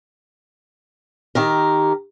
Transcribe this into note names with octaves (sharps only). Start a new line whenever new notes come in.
D#3 G4 A#4